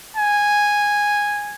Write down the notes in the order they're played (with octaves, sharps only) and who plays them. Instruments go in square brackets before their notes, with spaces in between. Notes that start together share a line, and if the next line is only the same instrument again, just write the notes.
[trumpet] G#5